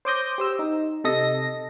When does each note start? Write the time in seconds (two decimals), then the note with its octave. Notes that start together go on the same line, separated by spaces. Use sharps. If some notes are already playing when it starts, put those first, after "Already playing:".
0.05 C5 C#5 D6 D#6 G6 A#6
0.38 G4 C5 E6
0.59 D#4
1.04 C3 A4 D#5 A#6